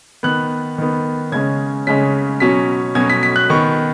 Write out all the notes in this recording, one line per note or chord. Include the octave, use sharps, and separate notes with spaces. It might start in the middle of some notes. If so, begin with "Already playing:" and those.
D#3 B3 F#6
D#3 B3
C#3 G#3 C#4 G#6
C#3 G#3 C#4 B6
B2 F#3 C#4 B6
B2 F#3 C#4 G#6
B6
B6
F#6
D#3 B3 C#6